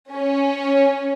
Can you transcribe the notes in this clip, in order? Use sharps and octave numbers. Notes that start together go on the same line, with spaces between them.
C#4